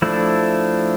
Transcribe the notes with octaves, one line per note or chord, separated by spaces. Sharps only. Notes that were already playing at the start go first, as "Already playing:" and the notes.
F3 A3 D4 E4